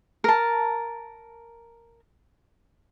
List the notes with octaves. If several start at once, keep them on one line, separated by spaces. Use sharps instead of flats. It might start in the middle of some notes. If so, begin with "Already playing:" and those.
A#4 A5